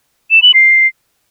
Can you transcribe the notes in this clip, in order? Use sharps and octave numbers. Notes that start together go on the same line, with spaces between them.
E7
F#7
C7